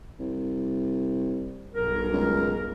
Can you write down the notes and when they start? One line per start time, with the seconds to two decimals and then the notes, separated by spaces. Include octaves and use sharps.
0.19 C2
1.74 B1 G2 A#4
2.13 C#2